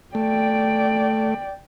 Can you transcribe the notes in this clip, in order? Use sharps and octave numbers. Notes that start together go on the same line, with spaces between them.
A3 D5 G5